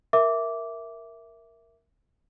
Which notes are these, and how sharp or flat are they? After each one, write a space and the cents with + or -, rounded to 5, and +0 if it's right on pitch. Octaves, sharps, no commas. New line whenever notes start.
A#4 +0 E5 +0 D6 -15